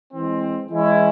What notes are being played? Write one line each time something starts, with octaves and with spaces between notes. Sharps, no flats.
E3 G#3 C4
E3 G#3 C#4 E4